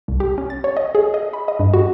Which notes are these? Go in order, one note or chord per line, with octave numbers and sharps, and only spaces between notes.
C2
G4
C#4
A6
C#5
D#5
G#4
D#5
B5
D#5
G2
F#4